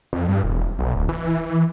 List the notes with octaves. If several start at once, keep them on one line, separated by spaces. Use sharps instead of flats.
F2
G2
E1
B1
D1
E3